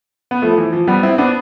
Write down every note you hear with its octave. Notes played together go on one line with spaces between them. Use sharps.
B3
F3 A3
E3
F3
G3 B3
C4 E4
B3 D4